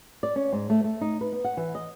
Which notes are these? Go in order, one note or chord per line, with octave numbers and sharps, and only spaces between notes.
D5
C#4
G#2
A3
A3
D#4
B4
B3
F#5
E3
D#5